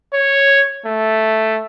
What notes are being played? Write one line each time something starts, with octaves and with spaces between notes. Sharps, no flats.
C#5
A3